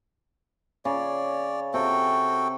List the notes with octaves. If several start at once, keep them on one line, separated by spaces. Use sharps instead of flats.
C#3 C#5 D5
C3 F#4 A4 G5